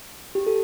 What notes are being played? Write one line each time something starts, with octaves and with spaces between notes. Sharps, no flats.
G4
A4